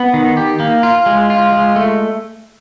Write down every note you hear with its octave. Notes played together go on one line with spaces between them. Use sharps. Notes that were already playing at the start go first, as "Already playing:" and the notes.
Already playing: B3
D#3
G4
A#3
F4
G#3
F4
G#3
A3